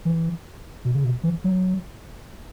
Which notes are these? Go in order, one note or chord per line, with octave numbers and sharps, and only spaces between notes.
E3
B2
C#3
B2
E3
F#3